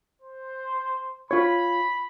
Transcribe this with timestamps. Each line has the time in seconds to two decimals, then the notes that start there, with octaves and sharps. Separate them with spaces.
0.22 C5
1.31 F4 C#5 B5